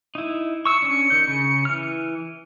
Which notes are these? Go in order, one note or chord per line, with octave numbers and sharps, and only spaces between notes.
D#4 E4
C#6 E6 C#7
C#4 D4
D#3 G6
C#3
E3 F6